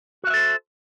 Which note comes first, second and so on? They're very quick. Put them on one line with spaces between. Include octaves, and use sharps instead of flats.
F#4 F5 E5 A4 C5